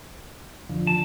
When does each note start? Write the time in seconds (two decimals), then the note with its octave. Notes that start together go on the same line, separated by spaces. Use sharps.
0.69 F2 D3 F3
0.87 A5